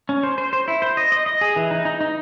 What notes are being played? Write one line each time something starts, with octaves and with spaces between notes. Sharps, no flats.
C#4
C5
C5
C5
E4
C5
D#5
D#5
D#5
G#4
E3
D#4
D#4
D#4